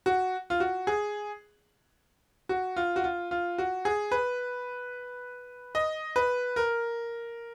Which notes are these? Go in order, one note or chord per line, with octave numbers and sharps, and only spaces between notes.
F#4
F4
F#4
G#4
F#4
F4
F#4
F4
F4
F#4
G#4
B4
D#5
B4
A#4